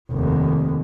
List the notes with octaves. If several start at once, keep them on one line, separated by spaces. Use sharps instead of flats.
F1 D#2